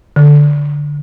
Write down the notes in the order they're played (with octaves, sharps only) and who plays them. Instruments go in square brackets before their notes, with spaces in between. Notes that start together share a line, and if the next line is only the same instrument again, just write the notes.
[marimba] D3